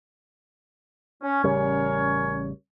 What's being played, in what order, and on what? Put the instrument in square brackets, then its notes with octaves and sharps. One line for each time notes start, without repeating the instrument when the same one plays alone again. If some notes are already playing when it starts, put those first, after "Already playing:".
[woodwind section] C#4
[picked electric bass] A1 C#3 G3 [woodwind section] C#4 A#4 C#5